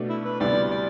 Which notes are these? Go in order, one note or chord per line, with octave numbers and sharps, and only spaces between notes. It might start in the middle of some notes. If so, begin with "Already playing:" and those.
Already playing: B2 A3 D4
E4
B4
D2 C3 G3 B3 E4 D5
D5